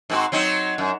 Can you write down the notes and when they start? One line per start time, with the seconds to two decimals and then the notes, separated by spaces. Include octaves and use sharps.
0.10 G#2 C4 F#4
0.32 F#3 C4 D#4
0.78 F#2